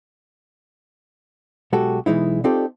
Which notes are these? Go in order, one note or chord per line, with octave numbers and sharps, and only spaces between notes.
B1 G#3 F#4 G4 A4
B1 E3 G#3 D#4 E4
C4 D#4 F4 G4 A4 D5